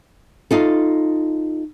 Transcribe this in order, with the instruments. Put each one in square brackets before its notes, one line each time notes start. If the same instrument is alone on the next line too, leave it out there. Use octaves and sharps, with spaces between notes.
[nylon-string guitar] D#4 F4 A4